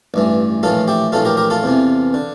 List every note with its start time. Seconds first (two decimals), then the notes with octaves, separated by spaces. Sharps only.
0.14 A1 G2 E3
0.63 A#1 A2 E3 F4 A4
0.88 E4 G4
1.12 A#1 A2 E3 F4 A4
1.25 G4 A#4
1.37 G4 A#4
1.50 F4 A4
1.63 E2 C3 E3
2.14 D3